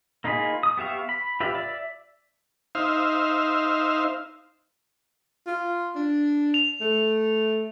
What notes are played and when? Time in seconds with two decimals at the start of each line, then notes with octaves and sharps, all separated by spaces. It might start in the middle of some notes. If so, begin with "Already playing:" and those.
0.24 A#3 D#4 F4 G#4 B5
0.63 D#6
0.77 B3 G4 E5 F5 C#6
1.09 B5
1.40 F4 G4 B4 E5
1.55 D5 E5
2.75 D#4 C5 E5 F5
5.47 F4
5.95 D4
6.54 F7
6.81 A3